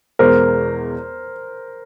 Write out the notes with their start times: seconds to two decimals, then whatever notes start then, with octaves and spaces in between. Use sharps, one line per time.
0.19 E2 B2 G#3 A#4 C5